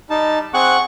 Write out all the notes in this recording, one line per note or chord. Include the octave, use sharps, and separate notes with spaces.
G3 D#4 A5
C4 G#4 F#5 C#6 F#6